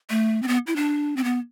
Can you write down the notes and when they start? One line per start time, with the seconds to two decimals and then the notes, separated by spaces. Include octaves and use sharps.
0.10 A3
0.43 C4
0.48 B3
0.67 E4
0.76 D4
1.17 C4
1.24 B3